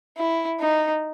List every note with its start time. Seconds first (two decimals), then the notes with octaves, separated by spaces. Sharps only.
0.17 E4
0.60 D#4